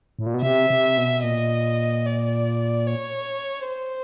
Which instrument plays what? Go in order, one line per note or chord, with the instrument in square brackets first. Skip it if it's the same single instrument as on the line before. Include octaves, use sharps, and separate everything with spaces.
[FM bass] A2
A#2
B2
[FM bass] C3 [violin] E5
[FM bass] C3
B2
[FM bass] A#2 [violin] D#5
[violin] D5
C#5
C5